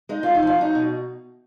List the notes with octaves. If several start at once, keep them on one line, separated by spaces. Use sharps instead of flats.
G#3 D#4
F2 F4
D#4
F3 F4
F#3 D#4
B2